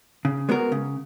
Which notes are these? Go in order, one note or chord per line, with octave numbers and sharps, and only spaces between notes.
C#3
G#3 B3 F#4 A#4
C#3